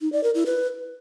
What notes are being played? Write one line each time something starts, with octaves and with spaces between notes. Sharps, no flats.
D#4
D5
A#4
E4
B4